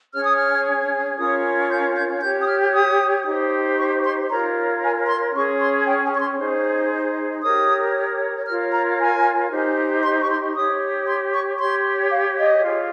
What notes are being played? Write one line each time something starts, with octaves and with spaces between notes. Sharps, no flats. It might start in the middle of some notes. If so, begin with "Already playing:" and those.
C#4 G#4 C#5 F6
D#6
F6
C#4 F4 A#4 C#5 D#6
G6
G6
G4 C#5 G6
D#6
F6
D#6
D#4 G4 C5
C#6
C6
F4 A#4 C#5 A#5
G#5
C6
C#4 G#4 C#5 C#6
C6
G5
G#5
C#6
C6
D#4 G#4 C5
G4 A#4 C#5 D#6
F4 A#4 C#5 F6
A#5
G#5
D#4 G4 C5
C6
C#6
C6
G4 C#5 D#6
C6
C#6
G4 C#5 C6
F5
D#5
F4 G#4 C#5